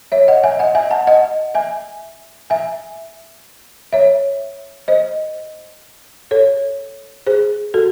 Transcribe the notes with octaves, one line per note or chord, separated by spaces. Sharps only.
C#5 E5
D#5 F#5
E5 G#5
D#5 F#5
E5 G#5
F#5 A5
D#5 F#5
E5 G#5
E5 G#5
C#5 E5
C5 D#5
A4 C#5
G#4 C5
F#4 A4